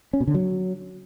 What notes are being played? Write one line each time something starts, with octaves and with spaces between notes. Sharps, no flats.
C#4
B2
D3
F#3